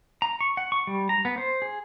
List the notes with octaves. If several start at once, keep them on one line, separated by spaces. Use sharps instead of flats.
A#5
C#6
F#5
C#6
G3
A#5
B3
C5
G#4